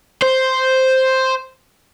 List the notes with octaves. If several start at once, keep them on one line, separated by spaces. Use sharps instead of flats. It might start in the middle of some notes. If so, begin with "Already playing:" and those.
C5